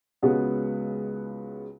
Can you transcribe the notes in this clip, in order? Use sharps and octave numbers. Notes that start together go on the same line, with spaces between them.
C#2 C#3 G#3 B3 F#4